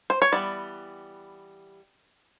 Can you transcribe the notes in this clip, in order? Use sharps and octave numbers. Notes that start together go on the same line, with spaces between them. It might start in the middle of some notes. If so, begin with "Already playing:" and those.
C5
C#5
E3 G3 B3 D5